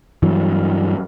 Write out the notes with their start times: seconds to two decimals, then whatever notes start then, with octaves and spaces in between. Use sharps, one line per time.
0.23 G2 E3 F#3